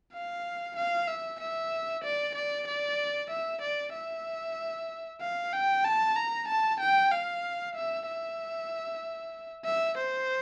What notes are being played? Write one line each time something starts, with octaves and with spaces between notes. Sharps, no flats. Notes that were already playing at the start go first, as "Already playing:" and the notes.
F5
F5
E5
E5
D5
D5
D5
E5
D5
E5
F5
G5
A5
A#5
A5
G5
F5
E5
E5
E5
C5